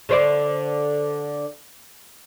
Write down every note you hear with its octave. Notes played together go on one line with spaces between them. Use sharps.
D3 C5 D5